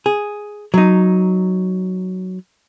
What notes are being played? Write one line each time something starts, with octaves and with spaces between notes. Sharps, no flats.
G#4
F#3 D#4